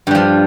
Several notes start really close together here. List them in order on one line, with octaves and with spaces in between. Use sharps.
G2 G3 F3